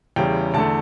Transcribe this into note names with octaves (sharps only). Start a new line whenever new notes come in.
E2 C#3 G3 C#4 G5
E2 D3 A3 A5